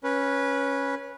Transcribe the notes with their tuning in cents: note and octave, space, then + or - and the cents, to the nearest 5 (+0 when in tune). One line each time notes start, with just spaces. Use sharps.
C#4 +0 B4 -15